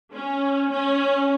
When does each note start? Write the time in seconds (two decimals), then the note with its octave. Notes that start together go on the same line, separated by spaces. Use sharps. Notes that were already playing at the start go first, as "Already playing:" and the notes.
0.13 C#4
0.71 C#4